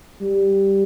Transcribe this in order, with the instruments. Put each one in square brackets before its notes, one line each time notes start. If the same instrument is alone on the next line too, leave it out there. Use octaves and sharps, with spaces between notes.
[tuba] G3